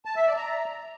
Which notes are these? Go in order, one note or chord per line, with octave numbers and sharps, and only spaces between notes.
A5
E5
D5
A#5